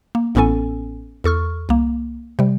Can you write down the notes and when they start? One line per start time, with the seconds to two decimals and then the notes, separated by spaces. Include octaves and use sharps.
0.15 A#3
0.35 A1 A2 B3 C#4 A4 G#5
1.24 E2 A4 C#6 F6
1.69 C2 A#3
2.39 C3 G3